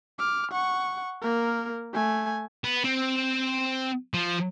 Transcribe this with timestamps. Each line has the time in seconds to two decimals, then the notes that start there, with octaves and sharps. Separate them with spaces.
0.19 D6 F6
0.51 F#5 C#6
1.22 A#3 A#4
1.93 A3 G#5
2.64 B3
2.84 C4
4.14 F3